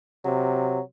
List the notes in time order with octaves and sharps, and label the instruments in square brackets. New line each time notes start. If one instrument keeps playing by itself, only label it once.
[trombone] C3 [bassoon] F#3